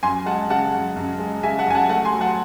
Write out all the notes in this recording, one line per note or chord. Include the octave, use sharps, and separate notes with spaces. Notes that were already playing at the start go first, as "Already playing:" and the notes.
F#2 G#5 C6
G#3 F#5 A5
C#3 F#5 A5
F#2
F#2
G#3
C#3 E5 G#5
F#5 A5
F#2 G#5
F#5 A5
A3 F#5 A5
G#5 C6
F#3
F#5 A5